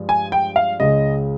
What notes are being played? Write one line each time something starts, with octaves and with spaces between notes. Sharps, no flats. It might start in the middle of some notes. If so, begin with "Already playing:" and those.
Already playing: G2 F3 G#3
G#5
G5
F5
C#2 C#3 G#3 D#5